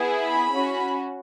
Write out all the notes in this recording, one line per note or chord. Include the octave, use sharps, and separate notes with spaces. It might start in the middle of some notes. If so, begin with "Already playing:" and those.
Already playing: B3 E4 G#4
B5
C#4 F#4